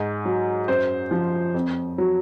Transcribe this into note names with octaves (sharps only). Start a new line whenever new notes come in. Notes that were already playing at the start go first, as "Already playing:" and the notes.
Already playing: G#2
F#3
F#2 C5
F3
F2
F#3